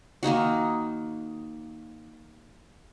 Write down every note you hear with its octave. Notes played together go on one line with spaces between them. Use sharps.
D#3 A#3 D#4 F#4